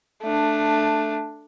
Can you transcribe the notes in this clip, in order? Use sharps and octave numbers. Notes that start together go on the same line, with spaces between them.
A3 D4